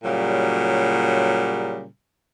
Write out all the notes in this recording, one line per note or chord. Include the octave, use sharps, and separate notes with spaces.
A#2 C#3 F#3 G3